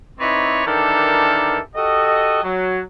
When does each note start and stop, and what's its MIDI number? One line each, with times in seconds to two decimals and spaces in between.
0.19 0.65 60
0.19 0.65 63
0.19 0.65 64
0.19 0.65 71
0.19 0.65 73
0.19 0.65 74
0.66 1.59 51
0.66 1.59 52
0.66 1.59 62
0.66 1.59 67
0.66 1.59 69
0.66 1.59 70
1.75 2.42 66
1.75 2.42 67
1.75 2.42 69
1.75 2.42 75
2.44 2.80 54